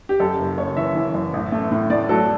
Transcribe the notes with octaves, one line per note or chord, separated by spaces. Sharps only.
G4
F#2 A4
F#1
F#1 C#5
E3 E5
E3
F#2
A1
A3
A2
A2 D5
F#3 A4